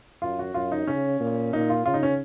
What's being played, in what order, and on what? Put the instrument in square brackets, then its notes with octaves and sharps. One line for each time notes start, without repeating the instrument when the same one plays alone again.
[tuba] F#2 [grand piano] F4
[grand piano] F#4
[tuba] F#2 [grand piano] F4
[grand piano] D#4
[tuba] C#3 [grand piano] C#4
[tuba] A#2
[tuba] A#2 [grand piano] D#4
[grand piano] F4
[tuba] C#3 [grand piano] F4
[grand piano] D#4
C#4